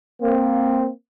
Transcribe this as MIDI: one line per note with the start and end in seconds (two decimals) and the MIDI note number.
0.22 0.89 58
0.22 0.89 60